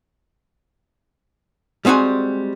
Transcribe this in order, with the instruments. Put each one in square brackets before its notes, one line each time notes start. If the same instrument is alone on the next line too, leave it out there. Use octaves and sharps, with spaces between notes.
[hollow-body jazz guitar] G3 G#3 C4 F#4 G#5